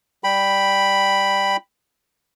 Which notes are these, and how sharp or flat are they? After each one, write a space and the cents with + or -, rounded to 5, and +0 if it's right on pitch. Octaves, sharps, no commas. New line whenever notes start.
G3 +0 G5 +0 B5 +0